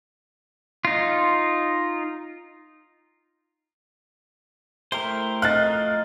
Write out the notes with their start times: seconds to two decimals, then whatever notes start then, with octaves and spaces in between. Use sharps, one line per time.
0.85 D#4 F4
4.92 A3 E4 G4 A#4 C5
5.42 F3 D#4 F5 F#6 A6